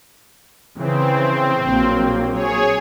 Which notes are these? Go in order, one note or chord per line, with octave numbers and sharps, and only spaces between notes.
C#3 E3 C4
A#1 F#3 A#3
G#4 C#5